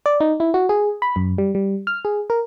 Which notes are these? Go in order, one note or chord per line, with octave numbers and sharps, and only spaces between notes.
D5
D#4
E4
F#4
G#4
B5
F#2
G3
G3
F6
G#4
A#4